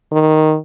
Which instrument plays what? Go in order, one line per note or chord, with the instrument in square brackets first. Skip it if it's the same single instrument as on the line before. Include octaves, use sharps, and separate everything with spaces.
[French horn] D#3